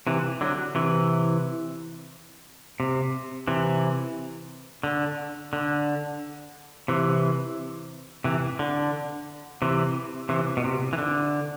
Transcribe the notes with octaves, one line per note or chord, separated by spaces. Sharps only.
C3 E3
D3 F#3
C3 E3
C3
C3 E3
D3
D3
C3 E3
C3 E3
D3
C3 E3
C3 E3
B2
C3
E3
D3